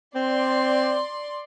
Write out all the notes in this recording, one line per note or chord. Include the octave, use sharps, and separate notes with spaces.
C4 D5 C6